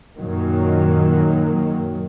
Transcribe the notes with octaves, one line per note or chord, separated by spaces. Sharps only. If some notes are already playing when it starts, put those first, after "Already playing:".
F#2 A#2 D#3 F#3 A#3